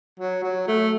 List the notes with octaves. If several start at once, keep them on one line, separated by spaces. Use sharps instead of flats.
F#3
F#3
A3